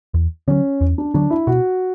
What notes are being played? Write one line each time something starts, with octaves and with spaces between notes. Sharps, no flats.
E2
D3 F#3 C#4
E2
D4
D3 F#3 D4
E4
B2 F#4